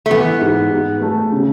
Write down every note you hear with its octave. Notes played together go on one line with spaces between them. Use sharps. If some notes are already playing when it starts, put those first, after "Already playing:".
A3
E3 B3
G#2
G#2
A3
C#3